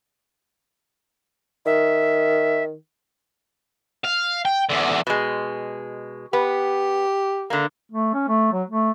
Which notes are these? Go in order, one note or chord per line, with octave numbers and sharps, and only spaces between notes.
D#3 E5
F5
G5
E2 D3
B2 G#3
B3 G4
D3 A#3
A3
C#4
A3
F#3
A3